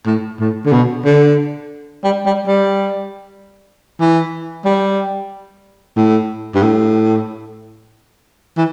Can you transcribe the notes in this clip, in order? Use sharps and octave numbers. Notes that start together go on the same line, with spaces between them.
A2
A2
D3
B2
D3
G3
G3
G3
E3
G3
A2
G2
A2
E3